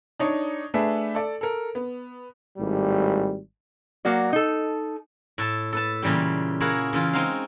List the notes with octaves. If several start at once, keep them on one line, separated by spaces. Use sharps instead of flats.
D4 D#4 C#5
A3 D4 G#4 B4 E5
A4 D5
A4 A#4
B3
G#1 A2 G3
F#3 A#3 F#4 D5
D#4 A4
A2 A4 A5
A4 B4 A5
A#2 C#3 E3 G3 G4
E4 F#4 G#4 A#4 F5 F#5
C#3 E3 F4
G#3 C4 D#4 F#4 F5